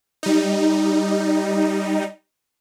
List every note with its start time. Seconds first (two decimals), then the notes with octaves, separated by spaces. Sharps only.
0.23 G3 D#4